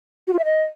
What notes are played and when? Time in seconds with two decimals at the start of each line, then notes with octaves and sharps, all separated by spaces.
0.27 F#4
0.33 F4
0.39 E5
0.45 D#5